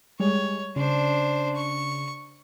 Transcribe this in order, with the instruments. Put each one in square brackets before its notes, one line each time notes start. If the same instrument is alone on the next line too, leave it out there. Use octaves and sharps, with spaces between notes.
[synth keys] G3 G#3 [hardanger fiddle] C#5
[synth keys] C#3 [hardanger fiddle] D4 C5
[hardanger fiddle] C#6